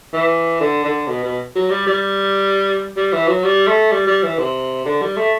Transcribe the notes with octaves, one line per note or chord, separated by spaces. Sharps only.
E3
D3
D3
B2
B2
F#3
G3
G3
G3
E3
F#3
G3
A3
G3
G3
E3
C3
D3
G3
A3